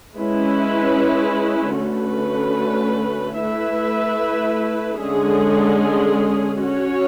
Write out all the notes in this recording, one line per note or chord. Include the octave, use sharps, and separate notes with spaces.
G#3 C#4 E4 B4
D3 A3 C#4 F#4 B4
A3 E4 B4 E5
D3 G#3 C#4 G#4
C#4 F#4 C#5